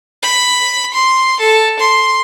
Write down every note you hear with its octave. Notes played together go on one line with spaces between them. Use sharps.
B5
C6
A4
C6